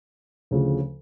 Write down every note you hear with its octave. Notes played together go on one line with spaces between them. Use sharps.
D2 C#3 F3